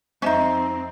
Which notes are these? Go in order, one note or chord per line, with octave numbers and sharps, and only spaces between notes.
F2 C4 C#4 D#4 C5 D#5 E5